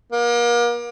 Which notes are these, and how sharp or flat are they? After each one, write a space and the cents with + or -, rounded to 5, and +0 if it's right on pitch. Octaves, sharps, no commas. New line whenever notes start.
A#3 +35